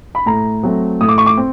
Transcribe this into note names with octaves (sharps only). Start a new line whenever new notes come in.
B5
A2 A#5
F#3 A3 C4
A2 D#6
D6
C#6
D6
C4